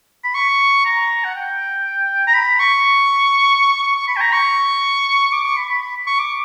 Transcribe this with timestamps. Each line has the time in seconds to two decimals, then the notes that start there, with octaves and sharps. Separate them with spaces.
0.24 B5
0.35 C#6
0.85 A#5
1.24 F#5
1.35 G5
2.27 A#5
2.34 B5
2.59 C#6
3.83 C#6
3.95 C#6
4.08 B5
4.16 G5
4.21 A#5
4.33 C#6
5.32 D6
5.45 C#6
5.57 B5
5.69 B5
5.82 B5
6.07 C#6
6.19 D6